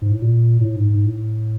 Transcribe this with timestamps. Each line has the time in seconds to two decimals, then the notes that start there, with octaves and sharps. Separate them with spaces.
0.02 G#2
0.12 A2
0.22 A#2
0.61 A2
0.76 G#2
0.90 G#2
1.05 A2